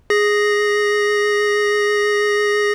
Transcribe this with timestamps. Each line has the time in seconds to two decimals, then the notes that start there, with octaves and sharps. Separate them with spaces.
0.10 G#4 A#6